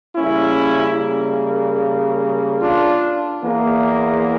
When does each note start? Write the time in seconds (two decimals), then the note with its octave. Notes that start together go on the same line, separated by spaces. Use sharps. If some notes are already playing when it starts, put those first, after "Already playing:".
0.16 C#3 G3 A#3 C#4 E4
2.61 D4 F4
3.43 E2 E3 A#3